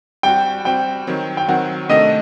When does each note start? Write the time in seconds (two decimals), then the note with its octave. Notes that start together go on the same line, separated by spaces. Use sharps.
0.23 G3 C4 F#4 G5
0.65 G3 C4 F#4 G5
1.07 D#3 F#3 C4
1.37 G5
1.48 D#3 F#3 C4 F#5
1.89 C3 D#3 A3 D4 D#5